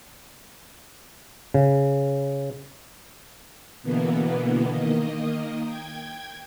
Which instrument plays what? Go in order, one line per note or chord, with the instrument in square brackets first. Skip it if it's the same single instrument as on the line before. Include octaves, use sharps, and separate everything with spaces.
[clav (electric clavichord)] C#3
[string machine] B2 D3 E3 A#3 B3
D#3 A#3 D#5
G5 G#6